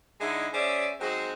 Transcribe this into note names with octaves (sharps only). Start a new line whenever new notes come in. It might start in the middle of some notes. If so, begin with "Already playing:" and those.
D3 G#3 D#4 E4
C#4 G#4 C5 D5 E5
F#3 G#3 C4 D#4 F#4 C5